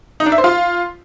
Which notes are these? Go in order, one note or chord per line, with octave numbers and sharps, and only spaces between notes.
D#4
D4
E5
C5
F4